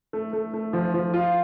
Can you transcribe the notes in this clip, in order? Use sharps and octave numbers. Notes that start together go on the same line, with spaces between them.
A3
A3
A3
F3
F3
F4